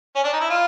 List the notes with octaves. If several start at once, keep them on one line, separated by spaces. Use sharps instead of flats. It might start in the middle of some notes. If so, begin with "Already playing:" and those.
C#4
D4
D#4
E4
F4